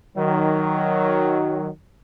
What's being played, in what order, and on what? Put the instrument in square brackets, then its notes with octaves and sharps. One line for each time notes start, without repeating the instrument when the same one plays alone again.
[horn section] D#3 F#3